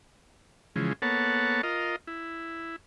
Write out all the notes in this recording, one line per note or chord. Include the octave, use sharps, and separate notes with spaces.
C#3 E3 F3 G#3
A#3 B3 A4 C#5 F#5 A5
F4 A#4 D#5
E4